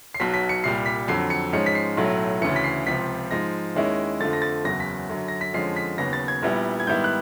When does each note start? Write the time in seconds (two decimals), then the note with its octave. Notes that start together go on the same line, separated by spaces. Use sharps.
0.14 C7
0.20 B1 B2 F#3 B6
0.34 B6
0.49 C#7
0.64 C2 A#2 G3 C7
0.86 B6
1.08 F2 D3 F#3 C7
1.30 C#7
1.53 G#2 F3 G#3 C#4 C#7
1.66 B6
1.75 C7
1.97 B1 A2 F#3 A3
2.41 D2 C#3 E3 C#7
2.56 B6
2.64 C7
2.87 C#2 C3 F3 B6
3.31 G#2 F3 G#3 A#6
3.75 D#2 D#3 G#3 C#4 E4
4.20 F2 D3 F3 A3 A6
4.33 A#6
4.42 A6
4.64 F#1 E2 C#3 F#3 A#6
4.80 B6
5.09 F#2 D3 F#3
5.28 A#6
5.41 B6
5.53 F2 D3 F3 G#3 C#4 C7
5.76 B6
5.98 D#2 C#3 F#3 B3 A#6
6.13 A6
6.28 G#6
6.43 A#1 A#2 G3 B3 E4
6.80 G#6
6.87 G#2 D#3 G3 B3 E4 G6
7.04 F#6